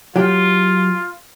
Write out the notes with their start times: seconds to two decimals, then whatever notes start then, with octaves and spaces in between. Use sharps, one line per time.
0.16 F#3 F4 G4